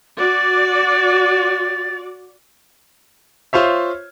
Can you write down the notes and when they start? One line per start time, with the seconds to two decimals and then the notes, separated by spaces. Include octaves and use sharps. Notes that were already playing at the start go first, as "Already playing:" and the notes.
0.19 F#4 D5 A6
3.53 F4 C5 C#5 E5